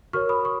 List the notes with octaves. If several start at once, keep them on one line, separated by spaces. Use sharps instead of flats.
F#4 A#4 C#5 C#6 F6
B5 D#6
C#6